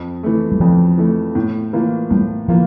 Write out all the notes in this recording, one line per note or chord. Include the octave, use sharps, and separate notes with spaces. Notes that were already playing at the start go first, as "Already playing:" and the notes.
Already playing: F2
E3 A3
G3
F2 F3
E3 A3
A2
E3 A#3 F4
A2 G3
E3 F3 A#3 F4